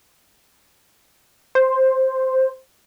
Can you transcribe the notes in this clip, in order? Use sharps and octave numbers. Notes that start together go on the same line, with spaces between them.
C5